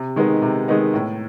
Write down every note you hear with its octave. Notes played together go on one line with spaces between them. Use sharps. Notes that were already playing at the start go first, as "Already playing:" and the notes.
Already playing: C3
D#3 G#3 B3 D#4
C3
D#3 G#3 B3 D#4
A2